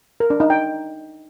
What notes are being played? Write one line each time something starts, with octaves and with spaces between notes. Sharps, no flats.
A#4
D4
D#4
G5